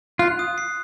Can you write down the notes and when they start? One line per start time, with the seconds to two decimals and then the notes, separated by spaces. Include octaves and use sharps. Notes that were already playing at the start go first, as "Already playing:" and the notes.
0.19 F4 F#6
0.39 D#6
0.58 C7